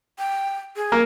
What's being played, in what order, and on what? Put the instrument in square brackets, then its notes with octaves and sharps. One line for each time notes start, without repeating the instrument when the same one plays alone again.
[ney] G5
G#4
[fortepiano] A#3